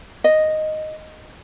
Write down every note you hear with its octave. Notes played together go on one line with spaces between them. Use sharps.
D#5